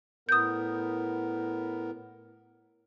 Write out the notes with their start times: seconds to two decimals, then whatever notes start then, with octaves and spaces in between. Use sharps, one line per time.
0.29 A2 B3 A#4 D#6 G6